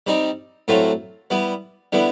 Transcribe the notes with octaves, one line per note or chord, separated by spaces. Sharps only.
G3 C4 D#4
A2 F#3 A3 C4 F4
G3 B3 E4
D3 G3 B3 E4